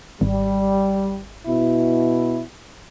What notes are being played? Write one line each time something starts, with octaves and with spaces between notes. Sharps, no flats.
G#1 G3
B2 E4